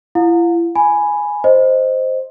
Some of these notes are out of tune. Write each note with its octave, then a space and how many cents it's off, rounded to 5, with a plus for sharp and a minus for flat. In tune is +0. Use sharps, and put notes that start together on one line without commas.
E4 +45 F5 +45
G#5 +0 B5 +0
C5 +0 D#5 +0